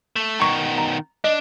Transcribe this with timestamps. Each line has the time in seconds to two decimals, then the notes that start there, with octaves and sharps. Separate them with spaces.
0.16 A3
0.40 B2 D#3 A#5 C#6
0.78 A#5
1.24 D4 D#5